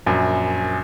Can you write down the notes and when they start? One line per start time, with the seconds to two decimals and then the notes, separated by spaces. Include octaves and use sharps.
0.06 A#1 F#2